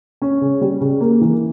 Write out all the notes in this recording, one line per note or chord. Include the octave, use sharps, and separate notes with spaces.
C#4
C#3
G3
C#3
A#3
E3